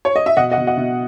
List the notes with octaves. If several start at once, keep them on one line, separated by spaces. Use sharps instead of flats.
C#5
D#5
E5
B2 D#5 F#5
D#5 F#5
B2
D#5 F#5
B2